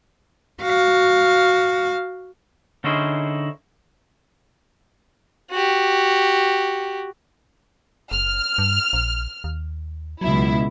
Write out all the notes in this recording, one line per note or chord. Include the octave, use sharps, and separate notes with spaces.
F#4 F5
D3 C#4 D#4 E4 G#4 C5
F#4 G4
F#1 F6
G2
A#1
D#2
C#2 B2 F#3 E4